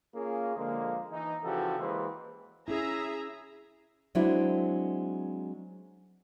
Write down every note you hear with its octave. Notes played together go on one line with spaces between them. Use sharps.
A#3 C#4 F4 G#4
D3 F3 G#3 A#3
E3 D#4
C#3 E3 F3 F#4 G4 A4
E3 G#3 A#3 G#4 B4 C5
C#4 E4 G#4 E5 A#5
F#3 G#3 C4 D4 E4 F#4